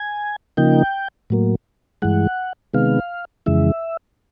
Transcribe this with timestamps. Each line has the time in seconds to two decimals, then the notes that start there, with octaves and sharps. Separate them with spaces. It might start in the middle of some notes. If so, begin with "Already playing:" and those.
Already playing: G#5
0.57 C#3 F3 A#3 D#4 G5
1.30 A2 F#3 A#3
2.02 G2 E3 G#3 F#5
2.74 C3 D#3 G#3 B3 F5
3.46 F2 C#3 E3 G#3 E5